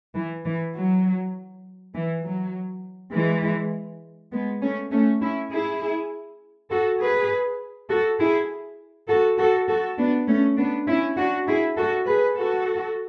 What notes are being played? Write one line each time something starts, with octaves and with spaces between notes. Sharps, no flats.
E3
E3
F#3
E3
F#3
E3 G#3
G#3 B3
A3 C#4
A3 C#4
C#4 E4
E4 G#4
F#4 A4
G#4 B4
F#4 A4
E4 G#4
F#4 A4
F#4 A4
F#4 A4
B3 D4
A3 C#4
B3 D4
C#4 E4
D4 F#4
E4 G#4
F#4 A4
G#4 B4
F#4 A4